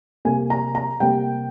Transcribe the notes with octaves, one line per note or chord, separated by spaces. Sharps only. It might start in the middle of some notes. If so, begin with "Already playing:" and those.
C3 G3 A#3 G#5
A#5
A#5
C3 G3 A#3 G5